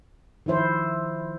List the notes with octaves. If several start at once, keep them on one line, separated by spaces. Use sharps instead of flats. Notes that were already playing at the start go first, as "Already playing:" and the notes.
D#3 F3 E4 C5